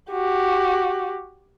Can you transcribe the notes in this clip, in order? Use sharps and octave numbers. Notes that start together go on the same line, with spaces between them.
F#4 G4